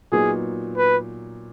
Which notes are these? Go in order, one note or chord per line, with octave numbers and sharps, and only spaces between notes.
A#2 F#3 B3 D#4 G#4
B4